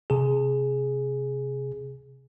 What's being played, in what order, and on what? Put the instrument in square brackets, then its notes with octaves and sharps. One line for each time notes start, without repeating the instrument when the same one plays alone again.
[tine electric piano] C3 G#4